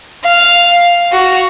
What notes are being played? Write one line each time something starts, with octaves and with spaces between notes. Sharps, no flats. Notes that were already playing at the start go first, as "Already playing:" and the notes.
F5
F#4